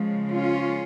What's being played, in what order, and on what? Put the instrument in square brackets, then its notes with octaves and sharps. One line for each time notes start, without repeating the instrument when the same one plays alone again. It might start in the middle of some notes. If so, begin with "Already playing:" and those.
Already playing: [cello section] C#3 F3 G#3
C#4 F4